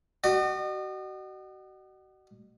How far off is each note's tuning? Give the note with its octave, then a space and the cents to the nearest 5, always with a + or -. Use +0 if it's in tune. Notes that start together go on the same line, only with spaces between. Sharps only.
F#4 +35 D#5 -40